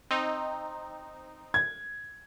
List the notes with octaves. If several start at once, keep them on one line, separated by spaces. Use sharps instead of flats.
C4 D#4
G#6